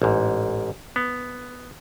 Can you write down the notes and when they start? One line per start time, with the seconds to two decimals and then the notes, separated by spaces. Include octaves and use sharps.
0.02 A1 G#2
0.96 B3